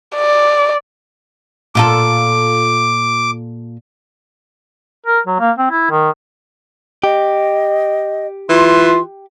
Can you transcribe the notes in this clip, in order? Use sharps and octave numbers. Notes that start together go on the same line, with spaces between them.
D5
A#2 F4 A4 D6
A#4
F#3
A#3
C4
E4
D#3
G4 D#5
E3 F4 C6